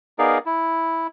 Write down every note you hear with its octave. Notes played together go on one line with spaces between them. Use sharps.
B3 D#4 G#4 A#4 D5 F5
E4